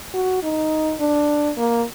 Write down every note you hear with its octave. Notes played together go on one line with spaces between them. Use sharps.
F#4
D#4
D4
A#3